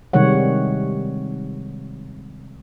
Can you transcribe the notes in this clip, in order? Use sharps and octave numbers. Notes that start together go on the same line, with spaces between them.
C3 D#3 G3 G#3 C#5 F#5